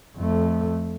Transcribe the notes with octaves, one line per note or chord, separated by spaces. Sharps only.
F2 A3